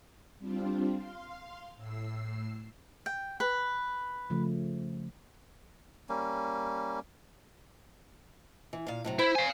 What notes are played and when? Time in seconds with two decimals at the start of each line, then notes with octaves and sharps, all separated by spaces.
0.39 G3 C4 D4 F4
0.96 F5 C6
1.76 A2 E6 C7
3.06 G5
3.40 B4
4.30 C#3 F3 A3
6.09 G3 A#3 C#4
8.73 E3
8.87 A#2 F5
9.04 A2 C3 F#3
9.19 E4 C5
9.35 F5 G#5